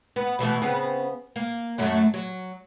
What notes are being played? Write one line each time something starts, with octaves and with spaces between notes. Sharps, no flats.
B3
B2 E3 A3
C#3 B3 C4
A#3
F#2 F#3 A3
F#3